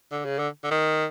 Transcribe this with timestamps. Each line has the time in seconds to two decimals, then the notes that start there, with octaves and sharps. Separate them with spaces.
0.12 D3
0.25 C#3
0.39 D3
0.64 D3
0.71 D#3